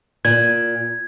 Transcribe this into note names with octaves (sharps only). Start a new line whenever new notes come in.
A#2 G#6